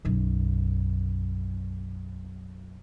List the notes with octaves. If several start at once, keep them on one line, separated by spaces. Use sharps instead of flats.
B1 F#2